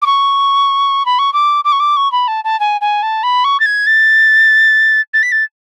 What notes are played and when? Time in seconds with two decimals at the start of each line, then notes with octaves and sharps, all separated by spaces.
0.02 D6
0.06 C#6
1.06 B5
1.19 C#6
1.33 D6
1.65 D6
1.72 C#6
1.80 D6
1.97 C#6
2.12 B5
2.28 A5
2.44 A5
2.60 G#5
2.81 G#5
3.03 A5
3.23 B5
3.44 C#6
3.60 A6
3.66 G#6
3.87 A6
5.14 A6
5.23 B6
5.32 A6